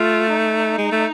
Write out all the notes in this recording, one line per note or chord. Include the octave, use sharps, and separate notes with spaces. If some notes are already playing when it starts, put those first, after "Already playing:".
Already playing: A3 F4
D#4
G#3
A3